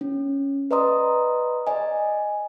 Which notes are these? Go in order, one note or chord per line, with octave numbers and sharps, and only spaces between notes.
C#4
B4 D5 D#5 A#5 C6 D#6
D5 D#5 G#5